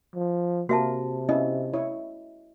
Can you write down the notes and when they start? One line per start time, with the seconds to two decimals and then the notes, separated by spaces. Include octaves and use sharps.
0.14 F3
0.69 C3 A#3 F#4 E5 A5
1.29 B3 C#4 E4 D#5
1.73 E4 C#5